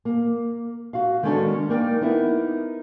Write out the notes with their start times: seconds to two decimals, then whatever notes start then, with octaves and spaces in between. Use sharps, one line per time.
0.05 A#3
0.93 F#4 F5
1.23 D#3 G#3 B3 C#4 D4 A4
1.69 A#3 D#4 A#4 D5 G5
2.01 B3 D#4 E4 A#4